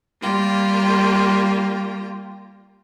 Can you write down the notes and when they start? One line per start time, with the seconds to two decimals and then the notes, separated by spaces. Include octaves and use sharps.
0.22 G3 A#3 F4 G5